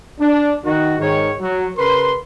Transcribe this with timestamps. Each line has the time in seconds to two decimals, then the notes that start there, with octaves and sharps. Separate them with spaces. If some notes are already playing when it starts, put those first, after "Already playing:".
0.20 D4
0.65 D#3 F#4
0.99 G#2 D#3 C#5
1.40 F#3
1.78 C#3 A#4 B4 C6